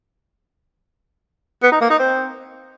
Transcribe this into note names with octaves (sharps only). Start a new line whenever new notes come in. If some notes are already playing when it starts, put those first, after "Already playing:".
B3
D#4
A#3
D#4
C4